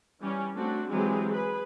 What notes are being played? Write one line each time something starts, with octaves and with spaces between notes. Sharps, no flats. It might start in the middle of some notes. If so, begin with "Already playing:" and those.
E3 G3 C#4
A3 C4 D4 F#4
E3 F#3 G#3 C4 G4 G#4
G#4 B4